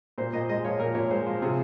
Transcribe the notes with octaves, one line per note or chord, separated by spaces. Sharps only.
A#2 C5
A#2 D#5
G#3 D#5
F3 C#5
A#2 A#4
A#2 C#5
G#3 C5
F3
C3 G#4